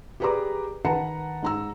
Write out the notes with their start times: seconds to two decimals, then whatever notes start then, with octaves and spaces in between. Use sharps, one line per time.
0.20 G4 G#4 B4 D5 A#5 D6
0.85 D#3 B4 F#5 A5 A#5 C#7
1.43 G#2 A#5 E6